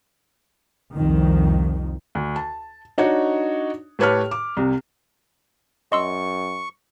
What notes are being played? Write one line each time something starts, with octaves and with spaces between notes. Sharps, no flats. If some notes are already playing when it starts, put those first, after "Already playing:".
C2 F2 D#3
D2
A5
D4 D#4 F#4 C#5
A2 G4 B4 C#5 A5 F6
D6
C2 C3
F#2 D#5 C6 C#6 E6